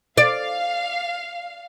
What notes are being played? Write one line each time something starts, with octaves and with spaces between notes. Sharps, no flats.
D5 F5